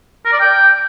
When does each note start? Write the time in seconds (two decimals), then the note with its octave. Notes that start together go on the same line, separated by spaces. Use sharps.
0.25 A#4
0.32 D5
0.40 G5